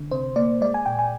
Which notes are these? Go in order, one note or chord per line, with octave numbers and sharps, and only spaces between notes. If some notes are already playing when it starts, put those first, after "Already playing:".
Already playing: D3
C3 C5
A#3 D5
G#3 D5
G#5
A#2 G5
G#5